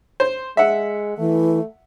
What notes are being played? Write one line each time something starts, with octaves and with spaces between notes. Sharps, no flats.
C5
G#3 E5 F#5
E3 A3